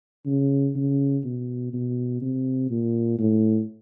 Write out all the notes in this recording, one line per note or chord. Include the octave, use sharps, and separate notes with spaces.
C#3
C#3
B2
B2
C3
A#2
A2